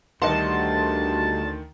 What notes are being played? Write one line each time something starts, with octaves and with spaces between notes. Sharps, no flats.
D2 D#3 G3 D#5 F#5 A5 C6